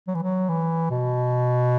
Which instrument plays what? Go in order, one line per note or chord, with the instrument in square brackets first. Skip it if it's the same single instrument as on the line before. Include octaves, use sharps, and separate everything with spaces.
[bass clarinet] F#3
E3
F#3
E3
B2